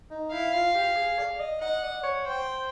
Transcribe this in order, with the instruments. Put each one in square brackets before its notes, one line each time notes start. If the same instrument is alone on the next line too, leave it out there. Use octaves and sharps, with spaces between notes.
[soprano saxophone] D#4
[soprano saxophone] E4 [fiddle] F5
[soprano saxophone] F4
G4
G#4
D5
D#5
[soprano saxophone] D#5 [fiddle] F#5
[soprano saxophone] D5
C#5
[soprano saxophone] C5 [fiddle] G5